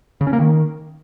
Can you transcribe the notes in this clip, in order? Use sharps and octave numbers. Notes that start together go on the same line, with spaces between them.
C#3
C#4
A#3
D#3